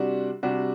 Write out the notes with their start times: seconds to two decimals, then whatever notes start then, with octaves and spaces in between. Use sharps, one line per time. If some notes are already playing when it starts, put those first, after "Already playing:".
Already playing: C3 G3 D4 F#4
0.43 C3 G3 D4 F#4